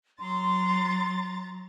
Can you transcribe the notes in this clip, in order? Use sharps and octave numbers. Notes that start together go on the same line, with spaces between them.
F#3 A#5 C6 A6